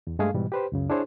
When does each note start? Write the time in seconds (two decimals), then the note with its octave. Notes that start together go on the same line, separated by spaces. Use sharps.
0.07 E2
0.19 G2 G#3 A3 G#4 F5
0.34 G#2 B2 E3 G3
0.52 G4 B4 C5
0.72 C#2 F#2 C#3
0.90 D4 E4 G#4 C5 C#5